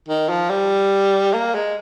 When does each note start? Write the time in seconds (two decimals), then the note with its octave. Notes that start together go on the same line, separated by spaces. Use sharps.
0.08 D#3
0.29 F3
0.49 G3
1.34 A#3
1.55 G#3